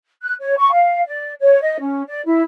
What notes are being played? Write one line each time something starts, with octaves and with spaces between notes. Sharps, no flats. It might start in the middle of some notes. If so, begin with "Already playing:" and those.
F#6
C#5
C#6
F5
D5
C#5
D#5
C#4
D5
E4